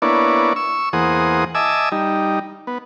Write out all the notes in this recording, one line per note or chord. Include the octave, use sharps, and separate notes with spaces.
A#3 B3 D4 E4 C#5 D5
C#6 E6
E2 A#3 G#4 C5 F#5 D#6
D#5 E5 G#5 A5 D6 E6
G3 D#4
B3